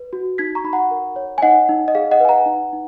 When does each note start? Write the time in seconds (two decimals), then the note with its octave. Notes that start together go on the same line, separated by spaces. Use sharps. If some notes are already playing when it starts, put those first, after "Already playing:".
Already playing: B4
0.13 F#4
0.38 D#4 G#6 B6
0.55 A#5 C#6
0.64 D#4 B5
0.73 F#5 A#5
0.91 A#4
1.16 C#5
1.38 G#5
1.42 D#4 D#5 F#5
1.69 D#4
1.88 D#5
1.95 G#4 F5
2.11 D#5 F#5
2.20 B4 G#5
2.29 F#5 A#5
2.46 D#4
2.73 D#4